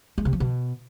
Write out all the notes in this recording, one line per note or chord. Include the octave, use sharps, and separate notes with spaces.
G#3
C3
F3
B2